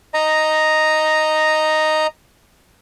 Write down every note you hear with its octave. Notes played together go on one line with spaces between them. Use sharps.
D#5 A#5